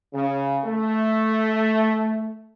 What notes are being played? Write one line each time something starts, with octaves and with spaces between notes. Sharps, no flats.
C#3
A3